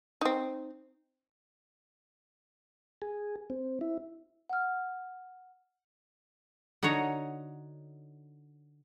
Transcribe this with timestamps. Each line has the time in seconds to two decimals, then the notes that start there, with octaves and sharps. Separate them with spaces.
0.21 C4 D#4
3.02 G#4
3.50 C4
3.81 E4
4.49 F#5 F6
6.83 D3 D#4 F#4 C#5 D#5 A#5